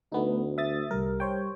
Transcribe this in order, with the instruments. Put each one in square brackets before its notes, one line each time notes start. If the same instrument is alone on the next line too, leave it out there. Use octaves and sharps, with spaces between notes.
[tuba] D2 [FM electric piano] A3 B3 D#4
[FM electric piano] E5 D#6 A6
[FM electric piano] C2 A#4 [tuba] G3
[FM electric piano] C5 C#5 G5